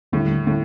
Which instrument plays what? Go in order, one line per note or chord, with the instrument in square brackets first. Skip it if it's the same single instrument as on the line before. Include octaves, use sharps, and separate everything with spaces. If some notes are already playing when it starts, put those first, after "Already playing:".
[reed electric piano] D#2 D3 G3 [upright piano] A2
[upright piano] A2